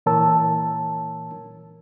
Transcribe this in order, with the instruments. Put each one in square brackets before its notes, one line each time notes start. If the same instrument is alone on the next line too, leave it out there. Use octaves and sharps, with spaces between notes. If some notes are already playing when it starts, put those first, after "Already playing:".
[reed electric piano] A#2 E3 A#4 C#5 A5 E6